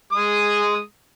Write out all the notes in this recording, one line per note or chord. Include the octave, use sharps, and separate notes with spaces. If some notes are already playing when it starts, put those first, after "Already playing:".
G#3 G#4 D#6